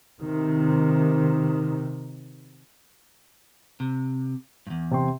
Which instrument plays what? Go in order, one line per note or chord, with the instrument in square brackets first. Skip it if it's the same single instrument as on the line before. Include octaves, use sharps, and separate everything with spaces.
[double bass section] C3 D#3
[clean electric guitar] C3
E2 G2
[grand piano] C3 G5 C6